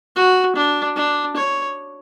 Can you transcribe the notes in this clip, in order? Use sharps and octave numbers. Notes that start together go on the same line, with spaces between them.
F#4
D4
D4
C#5